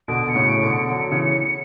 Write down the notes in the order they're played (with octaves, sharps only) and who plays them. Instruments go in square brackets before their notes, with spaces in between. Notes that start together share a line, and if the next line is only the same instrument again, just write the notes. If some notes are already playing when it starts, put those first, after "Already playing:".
[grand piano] B2 D3 [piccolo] D7
[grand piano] B2 [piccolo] C#7
[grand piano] A2 C#3
[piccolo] D7
[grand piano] B2 D3 [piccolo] D7
[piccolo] C#7
[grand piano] D3 F#3
C#3 E3